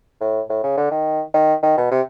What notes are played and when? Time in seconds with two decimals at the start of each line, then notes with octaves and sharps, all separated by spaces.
0.21 A2
0.50 A2
0.64 C#3
0.78 D3
0.91 D#3
1.34 D#3
1.63 D#3
1.77 B2
1.91 C3